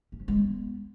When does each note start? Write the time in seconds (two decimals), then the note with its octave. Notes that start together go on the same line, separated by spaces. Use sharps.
0.12 C#4
0.20 F3
0.28 G#3
0.36 B3